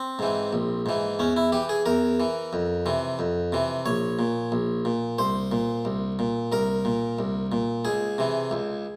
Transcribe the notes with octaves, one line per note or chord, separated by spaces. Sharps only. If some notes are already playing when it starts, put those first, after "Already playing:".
Already playing: C4
G#2 E3
A#1
G#2 E3
E2 C#4
E4
E3 G4
G#4
E2 A#4
E3
F2
C3 E3
F2
C3 E3
A#1 C#5
A#2
A#1
A#2
C2 C5
A#2
C2
A#2
C2 A#4
A#2
C2
A#2
C#2 G#4
C3 E3
C#2